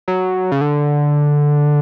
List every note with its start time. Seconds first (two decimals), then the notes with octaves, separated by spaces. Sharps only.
0.08 F#3
0.52 C#3
0.61 D3